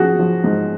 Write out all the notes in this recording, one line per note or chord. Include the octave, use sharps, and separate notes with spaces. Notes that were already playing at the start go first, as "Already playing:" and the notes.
Already playing: F3 C#4 F#4 G#4
F3
G#2